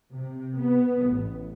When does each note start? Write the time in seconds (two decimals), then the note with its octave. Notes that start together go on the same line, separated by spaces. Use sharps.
0.13 C3
0.61 B3
1.08 A1